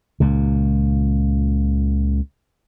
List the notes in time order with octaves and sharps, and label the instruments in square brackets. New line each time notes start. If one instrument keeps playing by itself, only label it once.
[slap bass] C#2 A#2